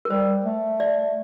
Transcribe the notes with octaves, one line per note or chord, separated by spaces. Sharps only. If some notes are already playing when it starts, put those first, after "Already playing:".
A#4
G3 C5
A3
D5